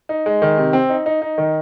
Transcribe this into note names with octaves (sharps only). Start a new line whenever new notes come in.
D#4
G#3
D#3
C3
C4
D#4
D#4
D#4
D#3